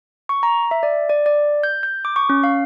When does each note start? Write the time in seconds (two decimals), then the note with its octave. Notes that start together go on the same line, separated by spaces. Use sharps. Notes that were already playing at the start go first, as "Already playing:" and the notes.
0.29 C#6
0.43 A#5
0.71 E5
0.83 D5
1.09 D5
1.26 D5
1.63 G6
1.83 G6
2.05 D6
2.16 C#6
2.29 C#4
2.44 F5